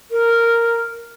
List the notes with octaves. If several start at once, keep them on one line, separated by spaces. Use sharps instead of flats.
A#4